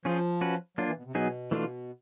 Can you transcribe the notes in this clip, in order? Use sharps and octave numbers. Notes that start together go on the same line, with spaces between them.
F3 C#4 F4 G#4 C5
C#4 F#4 B4
F#3 A#3 D4 F4
E3
B2
C3
B2 F#3 B3 D#4 G#4
E3 A3 D4 F4